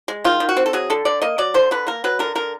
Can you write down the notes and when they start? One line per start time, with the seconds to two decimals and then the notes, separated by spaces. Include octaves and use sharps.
0.08 G#3
0.24 D#3 F4
0.40 D#3
0.49 F#4
0.57 C4
0.66 A4
0.73 F#3 G#4
0.90 D3 A4
1.05 D3 D5
1.22 A#3 D#5
1.38 F#3 D5
1.54 D3 C5
1.71 D3 B4
1.87 A#3 A#4
2.04 F#3 B4
2.19 D3 A#4
2.35 D3 A#4